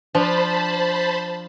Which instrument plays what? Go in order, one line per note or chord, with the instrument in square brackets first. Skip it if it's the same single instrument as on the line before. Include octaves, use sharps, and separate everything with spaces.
[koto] F3 D4 [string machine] C5 A5 B5